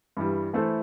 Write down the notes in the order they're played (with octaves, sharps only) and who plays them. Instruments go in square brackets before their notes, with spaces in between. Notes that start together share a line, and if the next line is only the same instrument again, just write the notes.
[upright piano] G2 E3 G3
E3 A3 E4 A4 C5